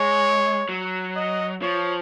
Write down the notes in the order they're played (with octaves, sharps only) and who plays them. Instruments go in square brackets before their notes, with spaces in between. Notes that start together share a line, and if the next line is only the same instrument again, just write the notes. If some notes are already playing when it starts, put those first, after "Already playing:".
Already playing: [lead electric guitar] G#3 [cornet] C#5
[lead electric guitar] F#3
[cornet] D#5
[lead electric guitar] F3 [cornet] C#5